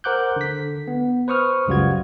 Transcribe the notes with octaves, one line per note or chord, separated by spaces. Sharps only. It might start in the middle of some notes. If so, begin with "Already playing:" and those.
A#4 C5 F#5 D6 F#6 G6
D3 B6
B3
B4 C5 C#6 D#6 F6
C#2 F#2 G3 F4 F#4 G#6